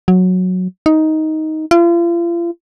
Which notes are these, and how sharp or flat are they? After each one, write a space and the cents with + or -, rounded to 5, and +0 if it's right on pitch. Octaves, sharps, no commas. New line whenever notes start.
F#3 -10
D#4 +10
F4 -40